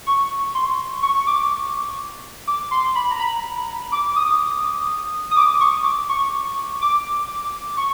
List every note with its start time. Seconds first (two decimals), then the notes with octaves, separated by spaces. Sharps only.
0.06 C#6
0.55 C6
1.03 C#6
1.15 C#6
1.27 D6
2.47 D6
2.71 C6
2.95 B5
3.11 A#5
3.20 B5
3.92 D6
4.16 D#6
5.31 D#6
5.36 D6
5.60 C#6
5.84 D6
6.09 C#6
6.81 D6
7.77 C#6